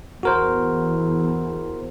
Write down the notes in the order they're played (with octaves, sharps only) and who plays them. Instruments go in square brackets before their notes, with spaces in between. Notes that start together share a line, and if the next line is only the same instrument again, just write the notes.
[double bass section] E2 [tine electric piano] F#4 A#4 C5